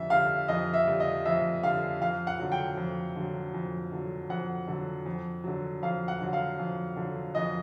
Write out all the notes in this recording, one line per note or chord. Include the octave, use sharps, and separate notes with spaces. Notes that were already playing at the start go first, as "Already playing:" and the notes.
Already playing: F2 D3 G3 E5
D3 G3 F5
F2 D#5
E5
D3 G3
D#5
F2 E5
D3 G3 F5
F2 F5
F#5
D3 F#3
G5
F2
D3 F#3
F2
D3 F#3
F2 F#5
D3 F#3
F2
D3 F#3
F2 F5
F#5
D3 F#3
F5
F2
D3 F#3
F2 D#5